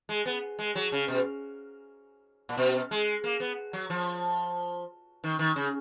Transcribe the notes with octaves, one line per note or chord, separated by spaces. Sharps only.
G#3
B3
G#3
F#3
C#3
B2
A#2
B2
G#3
A#3
B3
F#3
F3
D#3
D#3
C#3